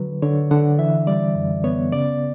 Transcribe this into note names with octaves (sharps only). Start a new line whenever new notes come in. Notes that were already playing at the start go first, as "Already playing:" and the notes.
Already playing: D3 F#3 B4
D3 C#5
D3 F#5
E3 E5
G3 D5
F#2
B3 C#5
C#3 D5